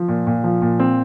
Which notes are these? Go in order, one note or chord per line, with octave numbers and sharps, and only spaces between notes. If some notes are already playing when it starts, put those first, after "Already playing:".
Already playing: F3
A#2
A#2
F3
A#2
C4